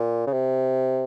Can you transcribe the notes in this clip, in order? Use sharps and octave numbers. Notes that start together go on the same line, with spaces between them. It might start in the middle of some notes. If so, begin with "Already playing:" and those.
Already playing: A#2
C#3
C3